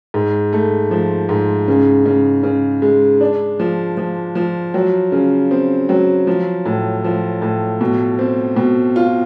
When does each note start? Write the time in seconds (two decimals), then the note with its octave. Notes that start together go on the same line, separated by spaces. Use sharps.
0.14 G#2
0.53 A3
0.91 F3
1.29 G#2
1.68 C#3
2.06 C#3
2.43 C#3
2.82 G#3
3.21 D4
3.60 F3
3.97 F3
4.35 F3
4.74 F#3
5.12 C#3
5.51 C4
5.89 F#3
6.27 F3
6.65 A2
7.04 F3
7.42 A2
7.81 B2
8.19 C4
8.56 B2
8.96 F4